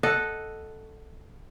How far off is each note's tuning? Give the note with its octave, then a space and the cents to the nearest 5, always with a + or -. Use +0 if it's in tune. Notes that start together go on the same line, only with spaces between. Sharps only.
A4 +0 D#5 +0 F#5 +0